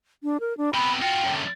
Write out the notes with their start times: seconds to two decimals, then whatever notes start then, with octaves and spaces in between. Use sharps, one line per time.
0.23 D4
0.40 A#4
0.58 D4
0.74 C3 B3 B5
1.01 F4 F#4 G5
1.24 F#2 D3